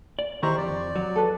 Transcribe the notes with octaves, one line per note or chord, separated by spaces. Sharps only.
D5
D#3 E4 G4 C5 A#5 C#6
F2 D5
F#3
A4 B4